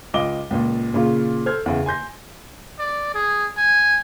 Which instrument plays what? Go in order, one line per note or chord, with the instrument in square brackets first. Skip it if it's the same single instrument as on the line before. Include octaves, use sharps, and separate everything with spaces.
[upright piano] C#2 F4 D#5 D6 G7
C#2 A#2
A#2 C#3 F4
A4 C5 F6 G#6
E2 C#3
G#5 C6 G6 A#6
[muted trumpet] D5
G#4
G#5